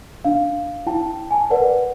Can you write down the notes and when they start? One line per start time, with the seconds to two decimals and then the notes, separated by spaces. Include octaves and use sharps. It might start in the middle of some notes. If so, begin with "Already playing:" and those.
0.25 D4 F5
0.86 E4 G5 A5
1.31 G#5 A5
1.50 A#4 B4 D5 F#5